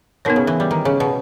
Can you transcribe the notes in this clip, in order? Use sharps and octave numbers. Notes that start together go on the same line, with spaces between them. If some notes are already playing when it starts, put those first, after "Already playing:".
B2 B3 D#4 A#4 C#5
C#3
E3
G3
D#3
C#3
B2